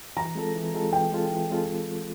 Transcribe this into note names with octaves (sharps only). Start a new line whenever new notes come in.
E3 A#5
G#3 C4 F4 A4
E3
G#3 C4 F4 A4
E3 G5
G#3 C4 F4 A4
E3
G#3 C4 F4 A4